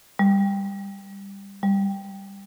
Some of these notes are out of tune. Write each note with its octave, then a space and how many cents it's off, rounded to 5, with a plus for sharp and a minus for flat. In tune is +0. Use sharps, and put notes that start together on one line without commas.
G3 +15
G3 +10